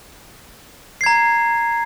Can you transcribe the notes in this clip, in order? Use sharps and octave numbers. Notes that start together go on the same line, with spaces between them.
A#5 G#6 C7